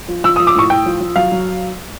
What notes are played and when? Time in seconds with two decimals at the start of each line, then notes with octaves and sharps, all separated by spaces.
0.08 F3
0.24 F3 E6
0.36 F3 D#6
0.47 D6
0.55 A2 C#6
0.70 A2 G5
0.86 F3
1.00 F3
1.16 F#3 F5
1.32 F#3